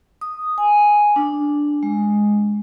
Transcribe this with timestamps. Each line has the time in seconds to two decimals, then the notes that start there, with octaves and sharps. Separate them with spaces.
0.21 D#6
0.58 G#5
1.16 D4
1.83 G#3